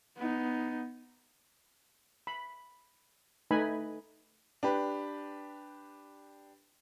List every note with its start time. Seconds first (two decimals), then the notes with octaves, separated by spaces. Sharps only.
0.17 B3 D#4
2.27 B5
3.51 A3 D#4 B4 D#5 G#5 B5
4.63 D4 G4 B4